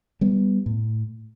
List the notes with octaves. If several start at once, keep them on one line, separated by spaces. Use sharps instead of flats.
G3 B3
A2